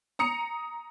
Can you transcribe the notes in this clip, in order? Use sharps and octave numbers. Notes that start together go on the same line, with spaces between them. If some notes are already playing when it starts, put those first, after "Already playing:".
A#5 D#6 C#7 F7